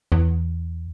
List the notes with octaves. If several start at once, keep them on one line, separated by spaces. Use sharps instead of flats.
E2